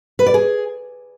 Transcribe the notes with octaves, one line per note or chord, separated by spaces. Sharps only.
B4
D5
G#4